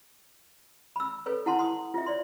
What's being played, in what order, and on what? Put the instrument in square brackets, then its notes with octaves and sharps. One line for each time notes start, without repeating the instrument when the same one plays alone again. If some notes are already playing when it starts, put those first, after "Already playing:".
[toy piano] B5 E6
A4 B4 C#5
E4 F#5 A5 C6
C6 D#6
F4 E5
C#5 D5 C6